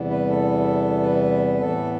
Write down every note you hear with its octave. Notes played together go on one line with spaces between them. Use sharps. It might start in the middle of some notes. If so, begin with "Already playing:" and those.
Already playing: E2 C3 E3 G3 B3
B4
A4
B4
A2 E3 B3 A4